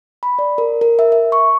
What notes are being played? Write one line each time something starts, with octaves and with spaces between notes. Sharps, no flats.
B5
D5
A#4
A#4
E5
E5
C#6